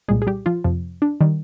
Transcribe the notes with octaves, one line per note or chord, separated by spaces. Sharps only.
C2 A#2 G3 G#3 G#4
G#4
G3 G4
F3 F4
F2 C3 F3
D4
D#3 G3